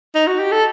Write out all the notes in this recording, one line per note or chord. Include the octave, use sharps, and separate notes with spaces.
D#4
F#4
G4
A4